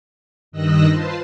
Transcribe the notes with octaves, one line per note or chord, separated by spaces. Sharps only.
G2 D#3 D#5 E6 F#6 A#6
F4 B4 C5 A5 C6